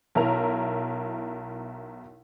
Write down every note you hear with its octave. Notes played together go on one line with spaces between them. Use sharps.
B1 E4 A#4 F7